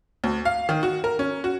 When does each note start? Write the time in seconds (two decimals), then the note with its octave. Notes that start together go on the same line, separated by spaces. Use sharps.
0.24 D2
0.45 F5
0.69 D#3
0.83 F#4
1.04 A#4
1.19 C#4
1.44 F#4